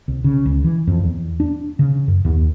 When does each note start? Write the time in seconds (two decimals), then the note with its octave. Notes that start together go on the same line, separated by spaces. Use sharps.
0.08 C2
0.24 C#3
0.46 C#2
0.64 E3
0.87 F2
1.04 E2
1.40 D4
1.79 C#3
2.08 F#2
2.25 D#2